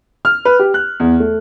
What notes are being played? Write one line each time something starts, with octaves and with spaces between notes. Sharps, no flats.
F6
B4
G4
F#6
E2
A3